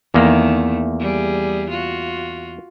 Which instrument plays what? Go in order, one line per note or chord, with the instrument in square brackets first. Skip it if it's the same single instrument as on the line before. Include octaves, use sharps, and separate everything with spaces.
[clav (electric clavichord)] E2 A#3 [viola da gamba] D#3 A3
[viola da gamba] G3 G#4
F4 F#4